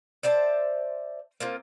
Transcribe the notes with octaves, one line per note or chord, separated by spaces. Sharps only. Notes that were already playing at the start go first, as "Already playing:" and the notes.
C5 D5 E5 A5
A#3 C4 F4